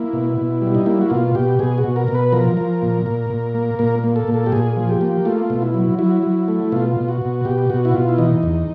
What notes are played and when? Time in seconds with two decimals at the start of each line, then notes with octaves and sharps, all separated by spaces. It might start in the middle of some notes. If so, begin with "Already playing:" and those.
Already playing: A#3 E4
0.13 B2
0.37 B2
0.62 G3
0.75 D#4
0.86 A#3 E4
1.01 F#4
1.10 B2 F4
1.35 B2 G4
1.59 B2 G#4
1.78 F#4
1.84 B2
1.96 A#4
2.08 B2
2.15 B4
2.32 F3 A#4
2.57 F3
2.82 A#2
3.06 A#2
3.30 A#2
3.55 A#3
3.79 A#2 A#4
4.04 A#3
4.16 A4
4.28 A#2
4.34 A4
4.46 G4
4.52 A#2 G#4
4.77 F3
4.89 G4
5.01 A#3
5.25 A3 F4
5.50 B2
5.62 E4
5.74 F#3
5.99 F#3 E4
6.23 F#3
6.48 A3
6.72 B2 F4
6.97 B2
7.09 F#4
7.22 B2
7.45 B2 G4
7.70 B2 F#4
7.85 E4
7.94 B2 F4
8.09 E4
8.18 E3 D#4
8.43 E2